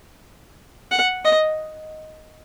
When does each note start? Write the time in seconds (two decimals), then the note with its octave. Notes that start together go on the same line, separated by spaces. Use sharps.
0.91 F#5
1.25 D#5